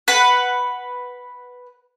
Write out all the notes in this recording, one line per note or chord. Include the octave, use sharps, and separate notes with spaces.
B4 F#5